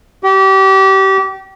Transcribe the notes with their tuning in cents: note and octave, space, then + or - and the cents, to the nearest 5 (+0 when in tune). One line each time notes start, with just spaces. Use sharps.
G4 -30